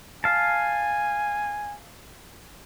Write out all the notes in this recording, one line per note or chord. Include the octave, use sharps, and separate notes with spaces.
F5 G#5 A5